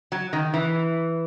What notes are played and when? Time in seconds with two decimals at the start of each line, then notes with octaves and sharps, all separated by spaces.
0.12 F#3
0.33 D#3
0.54 E3